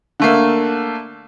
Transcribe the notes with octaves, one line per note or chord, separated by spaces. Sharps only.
D3 A3 A#3